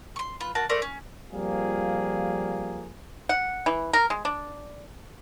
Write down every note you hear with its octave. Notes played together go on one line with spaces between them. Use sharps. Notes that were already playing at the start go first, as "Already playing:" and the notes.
C6 C#6
F4 B4
A#3 F#4 A5
A3 A#4 C5 D5
C#4
F2 F3 G3 A#3 G#4 F5
F#5
E3
A#4
G#3
D4